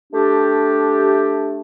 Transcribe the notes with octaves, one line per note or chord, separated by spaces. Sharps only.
A3 D4 G4